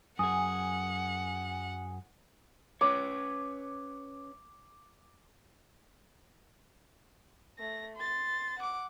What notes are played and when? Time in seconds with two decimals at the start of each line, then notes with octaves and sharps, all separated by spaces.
0.19 F#2 G#4 F#5 G#5 D#6
2.81 C#4 B4 C#5 D6
7.59 A3 A#6
7.96 C6 A6
8.59 F#5 D6